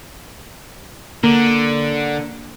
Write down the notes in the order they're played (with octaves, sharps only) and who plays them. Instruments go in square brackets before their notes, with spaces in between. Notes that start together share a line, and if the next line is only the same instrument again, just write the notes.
[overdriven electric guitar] D3 [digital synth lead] A#3